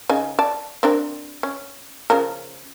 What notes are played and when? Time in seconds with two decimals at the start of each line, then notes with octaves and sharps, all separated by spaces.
0.09 C#3 D#4 G#5
0.39 D5 A5
0.83 C4 D4 A#4
1.43 C#4
2.10 C#3 F3 A#4